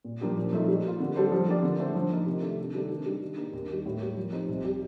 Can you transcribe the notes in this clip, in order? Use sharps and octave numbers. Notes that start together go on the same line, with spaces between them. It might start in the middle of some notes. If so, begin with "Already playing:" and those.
A#2
F3 A#3 D4 G4
A#2
F3 A3 D#4
G3
A#3 F4
D3
G3 D4 A4 C5
F3
A#3 D4 G4 D5
D3
A3 D4 A4 C5
F3
A#3 D#4
C3
D#3 A3 D4
C3
D#3 G3 D4 A4
D#3
G3 D4
D#3
A#3 D4 G4
D#2
D#3 G3
A2
G3 A#3
F3
C4 D#4 G4 C5
C2
C3 G3